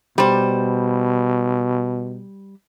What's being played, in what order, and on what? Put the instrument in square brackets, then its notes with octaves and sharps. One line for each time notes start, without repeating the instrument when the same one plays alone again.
[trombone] B2 [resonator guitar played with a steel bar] G3 C5